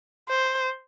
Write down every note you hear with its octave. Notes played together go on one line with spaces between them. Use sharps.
C5